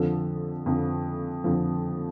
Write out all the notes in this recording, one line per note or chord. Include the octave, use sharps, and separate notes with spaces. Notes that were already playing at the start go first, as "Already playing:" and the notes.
Already playing: F2 D3 F3
F2 D3 F3
F2 D3 F3